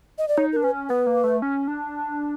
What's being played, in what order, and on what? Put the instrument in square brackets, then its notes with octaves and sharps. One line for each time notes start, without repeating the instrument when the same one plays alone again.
[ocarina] D#5
D5
[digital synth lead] D#4 [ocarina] C#5
[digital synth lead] D4 [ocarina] A#4
[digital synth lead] C#4 [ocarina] B4
[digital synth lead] B3 [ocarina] B4
[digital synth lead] A#3
A3
C#4
D4